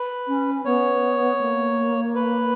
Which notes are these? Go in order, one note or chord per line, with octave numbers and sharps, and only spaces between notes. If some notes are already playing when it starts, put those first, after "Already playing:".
Already playing: B4
C#4
B3 C#5
A#3
B4